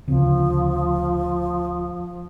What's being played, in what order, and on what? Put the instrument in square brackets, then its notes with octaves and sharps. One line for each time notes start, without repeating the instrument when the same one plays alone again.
[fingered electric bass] D2 C#3 C4 [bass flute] F3